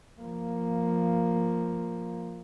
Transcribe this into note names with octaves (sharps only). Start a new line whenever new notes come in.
F3 A#3